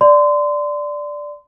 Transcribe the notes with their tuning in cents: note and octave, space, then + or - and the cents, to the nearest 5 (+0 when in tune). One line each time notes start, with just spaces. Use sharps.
D5 +0 C6 -30